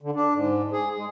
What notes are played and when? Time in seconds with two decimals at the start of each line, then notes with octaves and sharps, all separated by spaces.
0.01 D3
0.15 D4
0.34 G#2
0.73 G#4
0.97 G#3